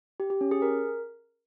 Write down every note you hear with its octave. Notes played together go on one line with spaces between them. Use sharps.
G4
G4
C#4
G#4
A#4